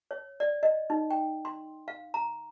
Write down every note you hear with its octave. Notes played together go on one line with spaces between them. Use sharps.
C#5
D5
D#5
D#4
G5
C6
F5
A#5